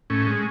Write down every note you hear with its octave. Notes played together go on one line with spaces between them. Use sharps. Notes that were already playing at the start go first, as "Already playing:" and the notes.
A2 C#4
G#3